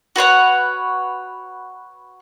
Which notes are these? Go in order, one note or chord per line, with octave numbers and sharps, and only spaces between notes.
F#4 B4 C#5 F#5